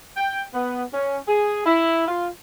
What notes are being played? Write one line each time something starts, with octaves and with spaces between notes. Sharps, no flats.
G5
B3
C#4
G#4
E4
F4